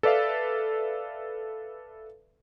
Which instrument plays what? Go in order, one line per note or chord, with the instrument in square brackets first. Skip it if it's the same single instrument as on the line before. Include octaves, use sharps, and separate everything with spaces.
[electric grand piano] A4 B4 D5 E5 F5